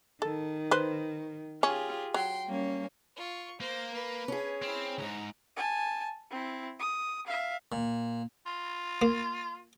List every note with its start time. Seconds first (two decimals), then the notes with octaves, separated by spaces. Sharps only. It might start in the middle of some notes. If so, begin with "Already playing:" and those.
0.22 D#3 A4
0.71 B4 C5
1.63 C#4 F4 G4 G#4
2.14 F#3 G5 C6
2.47 G3 A#3 C#4
3.16 F4 C#6
3.60 A#3 C5
3.94 B4
4.28 C#4 G#4
4.62 C4 E4 F6
4.98 D2 G#2 A#5
5.56 G#5 A5
6.31 C4 E4
6.80 D#6
7.27 E5 F5
7.72 A#2
8.46 F4
9.02 A#3